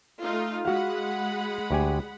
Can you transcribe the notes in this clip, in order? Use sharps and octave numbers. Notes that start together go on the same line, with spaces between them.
A3 D#4 F4
G#3 F#4 F5 F#5 B5
D2 G4 G#5